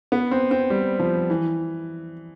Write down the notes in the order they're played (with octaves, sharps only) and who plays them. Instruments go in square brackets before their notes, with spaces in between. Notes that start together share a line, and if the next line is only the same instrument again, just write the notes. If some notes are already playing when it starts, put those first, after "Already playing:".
[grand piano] B3
C4
C4
G3
F3
E3